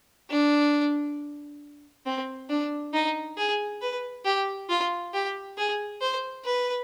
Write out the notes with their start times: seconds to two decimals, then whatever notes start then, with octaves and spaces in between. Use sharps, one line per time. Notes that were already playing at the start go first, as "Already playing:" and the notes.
0.30 D4
2.06 C4
2.49 D4
2.93 D#4
3.37 G#4
3.81 B4
4.25 G4
4.69 F4
5.13 G4
5.57 G#4
6.02 C5
6.45 B4